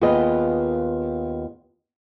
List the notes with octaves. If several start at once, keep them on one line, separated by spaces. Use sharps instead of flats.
D#2 B3 F4 G#4 B4 D#5